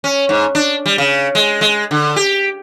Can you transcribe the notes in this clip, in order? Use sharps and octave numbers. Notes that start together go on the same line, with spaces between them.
C#4
G#2
D4
G3
C#3
G#3
G#3
D3
G4